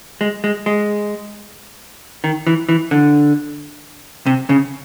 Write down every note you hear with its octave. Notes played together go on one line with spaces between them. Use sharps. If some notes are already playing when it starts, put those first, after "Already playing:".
G#3
G#3
G#3
D#3
E3
E3
D3
C3
C#3